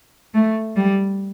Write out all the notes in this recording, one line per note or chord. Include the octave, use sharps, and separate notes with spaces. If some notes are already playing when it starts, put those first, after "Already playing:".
A3
G3